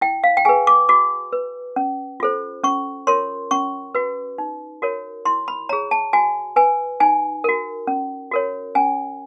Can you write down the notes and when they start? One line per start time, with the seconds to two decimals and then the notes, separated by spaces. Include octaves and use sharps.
0.01 E4 G5
0.24 F5
0.37 G5
0.45 G#4 B4 G#5
0.67 D6
0.89 F#4 D6
1.33 B4
1.76 C#4
2.20 F4 A4 C5
2.64 C#4 C#6
3.07 F4 A#4 C#5 C6
3.51 C#4 C#6
3.95 F#4 B4
4.38 D#4
4.82 F#4 A#4 C#5
5.25 E4 C6
5.48 B5
5.69 G#4 C#5 A#5
5.91 A5
6.13 F#4 G#5
6.56 B4 G#5
7.00 D#4 G#5
7.44 F#4 A#4
7.87 C#4
8.31 F#4 A#4 C#5
8.75 C#4 G#5